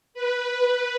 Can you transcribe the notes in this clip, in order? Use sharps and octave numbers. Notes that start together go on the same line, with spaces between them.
B4